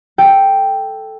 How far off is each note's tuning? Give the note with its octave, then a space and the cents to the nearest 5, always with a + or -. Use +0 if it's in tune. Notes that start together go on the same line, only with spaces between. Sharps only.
A4 +0 G5 +0